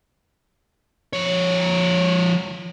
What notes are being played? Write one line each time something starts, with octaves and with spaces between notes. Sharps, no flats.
F3 C#5